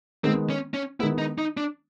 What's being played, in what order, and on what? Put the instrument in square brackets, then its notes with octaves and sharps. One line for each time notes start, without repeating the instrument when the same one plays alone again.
[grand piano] D#3 G#3 B3 [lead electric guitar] C4
[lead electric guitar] C#4
C#4
[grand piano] D#3 G#3 B3 [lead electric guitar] E4
[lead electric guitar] D#4
D#4
D4